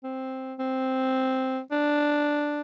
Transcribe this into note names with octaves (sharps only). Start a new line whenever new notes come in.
C4
C4
D4